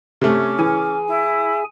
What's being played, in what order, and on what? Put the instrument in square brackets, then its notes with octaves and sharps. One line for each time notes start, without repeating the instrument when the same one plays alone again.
[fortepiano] C3 A3 [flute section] C#4 D6 F6
[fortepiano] E3 [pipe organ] G#4 G#5
[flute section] E4